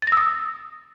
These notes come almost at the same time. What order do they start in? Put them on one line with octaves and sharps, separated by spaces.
A6 A#6 E6 D#6